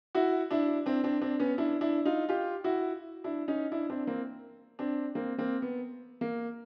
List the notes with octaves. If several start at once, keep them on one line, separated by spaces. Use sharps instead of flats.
E4 F#4
D4 E4
C4 D4
C4 D4
C4 D4
B3 C#4
D4 E4
D4 E4
D#4 F4
F4 G4
E4 F#4
D4 E4
C#4 D#4
D4 E4
C4 D4
A#3 C4
C4 D4
A#3 C4
A#3 C4
B3
A#3